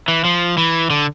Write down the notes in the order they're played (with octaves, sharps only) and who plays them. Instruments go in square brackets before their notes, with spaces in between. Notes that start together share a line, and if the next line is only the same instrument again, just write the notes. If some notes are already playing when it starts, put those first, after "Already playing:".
[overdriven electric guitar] E3
F3
E3
D3